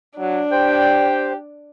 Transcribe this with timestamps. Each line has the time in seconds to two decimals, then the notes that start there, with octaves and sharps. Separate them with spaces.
0.19 F#3 D4
0.52 G4 C5 G5